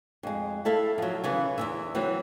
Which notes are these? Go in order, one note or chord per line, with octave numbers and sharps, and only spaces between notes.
F2 G#3
E4 A4 E5 F5
F3 F#3
C#3 E3 B3
E2 G#2 E5
E3 F#3 C4